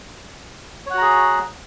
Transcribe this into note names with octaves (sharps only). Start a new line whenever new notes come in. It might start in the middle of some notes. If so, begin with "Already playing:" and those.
F#4 G#4 C#5 F#5 A#5